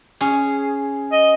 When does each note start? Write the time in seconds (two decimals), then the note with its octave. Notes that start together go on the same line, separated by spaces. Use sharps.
0.21 C#4 G#4
1.12 D#5